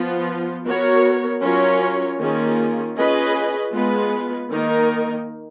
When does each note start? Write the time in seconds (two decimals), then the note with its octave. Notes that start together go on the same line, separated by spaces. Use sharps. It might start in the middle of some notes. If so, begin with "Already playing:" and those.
Already playing: F3 B3 F4
0.66 B3 F#4 A#4 C#5
1.42 F#3 C#4 F4 A#4 C#5
2.19 D#3 A#3 C#4 F4 G#4
2.96 C#4 F4 G#4 B4 D#5
3.72 G#3 B3 F4 B4
4.49 D#3 A#3 D#4 A#4